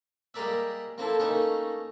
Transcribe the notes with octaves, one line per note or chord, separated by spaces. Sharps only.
G3 G#3 A#3 A#4 D5 E5
A#3 C4 E4 A4
A3 A#3 C#4 D#4 A4